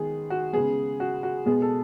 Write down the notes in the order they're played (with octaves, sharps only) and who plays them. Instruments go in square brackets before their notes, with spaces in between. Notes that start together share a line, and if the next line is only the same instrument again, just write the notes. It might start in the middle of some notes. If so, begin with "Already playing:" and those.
Already playing: [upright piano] D#3 G#3 B3 G#4
F#4
C#3 G#3 B3 G#4
F#4
F#4
B2 G#3 B3 G#4
A4